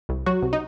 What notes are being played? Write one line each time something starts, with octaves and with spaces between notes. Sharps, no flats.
C2
F#3 F#4
C2
D#4